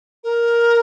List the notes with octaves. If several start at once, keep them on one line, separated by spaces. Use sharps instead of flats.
A#4